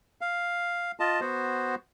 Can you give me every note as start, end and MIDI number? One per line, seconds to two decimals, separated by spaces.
0.21 0.92 77
1.00 1.20 65
1.00 1.20 75
1.00 1.20 81
1.21 1.75 59
1.21 1.75 66
1.21 1.75 72